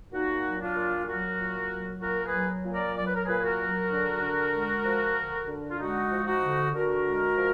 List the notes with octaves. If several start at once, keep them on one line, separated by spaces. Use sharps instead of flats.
A#2 D#4 F#4
F#3
D4 F4
A#2
F#3 F#4 A#4
A#2
F#3
A#2 F#4 A#4
G#4 B4
F#3
A#2
A#4 D5
F#3 D5
B4
A#4
A#2 G#4 B4
G#4
F#4 A#4
F#3
D3
D3
G#3
F3
D3
D3
F4
G#3 D#4 F#4
F3
D#4 F#4
D3
D3 F#4 A#4
G#3
F3